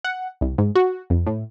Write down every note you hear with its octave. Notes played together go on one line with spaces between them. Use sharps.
F#5
C2
G#2
F#4
F2
A2